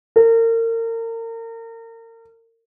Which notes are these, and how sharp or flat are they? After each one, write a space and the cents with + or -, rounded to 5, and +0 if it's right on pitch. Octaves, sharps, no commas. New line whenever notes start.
A#4 -35